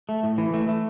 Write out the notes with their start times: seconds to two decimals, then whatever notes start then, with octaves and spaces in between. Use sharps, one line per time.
0.09 A3
0.23 A2
0.38 E3
0.54 A3
0.69 A3